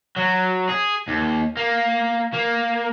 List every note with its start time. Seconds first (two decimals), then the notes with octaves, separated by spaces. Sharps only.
0.17 F#3
0.69 G#4
1.08 D#2
1.57 A#3
2.33 A#3